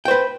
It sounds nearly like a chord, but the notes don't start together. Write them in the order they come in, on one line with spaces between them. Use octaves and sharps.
G5 C5 B4